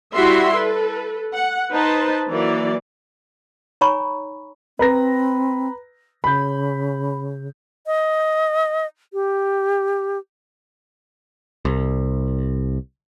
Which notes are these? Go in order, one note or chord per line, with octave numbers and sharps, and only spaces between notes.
G3 E4 F#4 G4 E5 C6
A4 B4
F#5
D#4 B4 C5 A5
E3 F#3 A#3 D5
D#4 C#5 G#5 A#5 B5 C#6
C4 B4 A#5 A#6
C#3 B5 G6
D#5
G4
C2